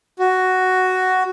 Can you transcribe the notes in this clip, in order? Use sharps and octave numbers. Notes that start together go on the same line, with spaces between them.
F#4